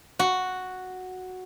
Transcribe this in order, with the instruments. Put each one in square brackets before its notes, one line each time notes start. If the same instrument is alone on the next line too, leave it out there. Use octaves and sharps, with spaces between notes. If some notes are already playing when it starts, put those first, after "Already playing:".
[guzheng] F#4